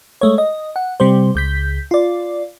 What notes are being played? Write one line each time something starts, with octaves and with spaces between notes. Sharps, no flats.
G#3 A3 C#5
D#5
F#5
C3 G3 C5
C#2 G6 B6
F4 D5